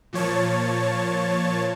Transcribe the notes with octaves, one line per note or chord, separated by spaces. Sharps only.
A#2 F3 C#5 A5